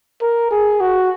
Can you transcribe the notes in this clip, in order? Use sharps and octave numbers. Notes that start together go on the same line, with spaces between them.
A#4
G#4
F#4